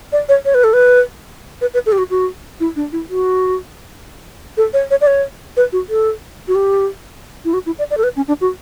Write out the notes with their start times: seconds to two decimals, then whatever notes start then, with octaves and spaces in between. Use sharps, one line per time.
0.12 D5
0.29 C#5
0.45 C#5
0.54 B4
0.64 A4
0.73 B4
1.61 B4
1.74 B4
1.86 A4
1.92 G4
1.98 F#4
2.10 F#4
2.60 E4
2.76 D4
2.92 E4
3.10 F#4
4.57 A4
4.73 C#5
4.91 C#5
5.01 D5
5.07 C#5
5.57 B4
5.72 F#4
5.89 A4
6.48 F#4
6.55 G4
7.45 E4
7.54 F#4
7.66 E4
7.79 D5
7.91 D5
7.97 A4
8.03 B4
8.16 C#4
8.28 D4
8.41 F#4